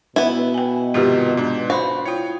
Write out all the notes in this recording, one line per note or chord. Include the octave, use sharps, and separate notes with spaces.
B2 B3 E4
G5 G#5
G#2 C3 D#3 F4 G4 B4
G#2 D4
F#4 C5 F5 B5 C6
E4 F4 C#5 G5